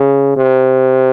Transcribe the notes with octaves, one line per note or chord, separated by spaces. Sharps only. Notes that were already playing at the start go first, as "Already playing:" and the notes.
Already playing: C#3
C3